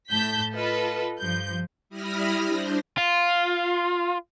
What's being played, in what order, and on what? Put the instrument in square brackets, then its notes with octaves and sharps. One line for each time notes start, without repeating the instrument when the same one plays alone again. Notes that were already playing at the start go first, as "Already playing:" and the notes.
[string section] A2 A5 G6 B6
F4 A4 B4 D#5
G2 F3 G6
[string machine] G3 E4 B5 D#6 F6 A#6
D4 C5
[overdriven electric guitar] F4